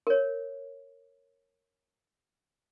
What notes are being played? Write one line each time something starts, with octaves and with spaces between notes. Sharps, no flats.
A#4 C#5